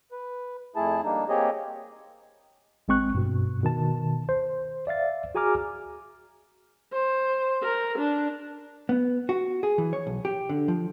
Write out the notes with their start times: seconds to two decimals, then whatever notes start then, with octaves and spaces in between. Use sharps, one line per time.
0.12 B4
0.76 F2 A3 E4 G#4 A5
1.04 G3 A#3 D4 D#4
1.29 A#3 C4 G4 G#4 C#5 D#5
2.88 G#1 G#3 C4 C#6 F#6
3.15 G2 B2
3.63 B2 D#3 A5
4.29 C5
4.87 D5 E5 F5 A6
5.35 F#4 G#4 G#5 A#5 D6 F6
6.93 C5
7.63 A#4
7.98 D4
8.89 B3
9.29 F#4
9.63 G#4
9.78 E3
9.93 C#5
10.07 B1
10.25 G4
10.49 D3
10.68 F3